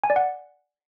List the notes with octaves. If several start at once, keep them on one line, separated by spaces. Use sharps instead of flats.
G#5
D5
F#5